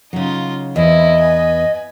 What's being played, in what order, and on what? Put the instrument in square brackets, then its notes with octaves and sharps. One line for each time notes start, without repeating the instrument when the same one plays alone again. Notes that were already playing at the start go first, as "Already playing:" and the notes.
[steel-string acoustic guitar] C#3 F#3 [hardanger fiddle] D#4 F4
[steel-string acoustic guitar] E2 [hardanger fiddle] C4 E4 [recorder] D#5
[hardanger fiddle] B4 G#5